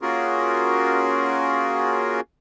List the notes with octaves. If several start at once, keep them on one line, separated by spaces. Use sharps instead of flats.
A#3 C#4 F4 F#4 G#4 A#4